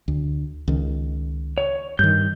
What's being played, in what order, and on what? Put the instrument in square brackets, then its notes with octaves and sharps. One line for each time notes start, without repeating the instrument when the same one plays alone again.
[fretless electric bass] D2
C#2 D#3
[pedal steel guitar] C#5
[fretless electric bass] G2 D#3 [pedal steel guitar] G6